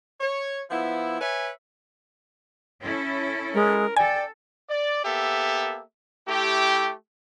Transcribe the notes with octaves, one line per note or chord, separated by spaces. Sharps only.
C#5
F3 B3 E4
B4 C#5 E5 G#5
C#4 E4 A4
G#3 A#4
A4 D5 G5 G#5
D5
A#3 B3 G4 A4 E5
A3 E4 G4